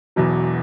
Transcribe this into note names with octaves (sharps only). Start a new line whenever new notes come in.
E1 E2 B2 F#3